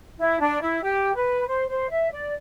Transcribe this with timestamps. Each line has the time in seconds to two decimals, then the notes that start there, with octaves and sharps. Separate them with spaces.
0.19 E4
0.40 D4
0.62 E4
0.83 G4
1.16 B4
1.47 C5
1.69 C5
1.90 E5
2.12 D5